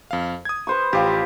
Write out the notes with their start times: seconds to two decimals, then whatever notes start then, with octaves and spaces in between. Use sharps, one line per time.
0.11 F2 F5
0.45 D#6 G#6
0.67 B4 C5 C#6
0.93 A1 F3 G4 F5